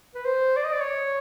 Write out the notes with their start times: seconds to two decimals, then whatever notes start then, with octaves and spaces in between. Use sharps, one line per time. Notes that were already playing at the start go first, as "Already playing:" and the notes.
0.15 B4
0.25 C5
0.56 D5
0.64 D#5
0.73 D5
0.81 C#5